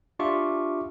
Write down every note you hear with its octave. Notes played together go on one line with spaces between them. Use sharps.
D4 F4 G4 E5 C#6 D6